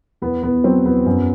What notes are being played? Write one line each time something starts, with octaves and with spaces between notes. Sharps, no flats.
E2 B3
E2 B3
F#3 C4
E2 B3
F#2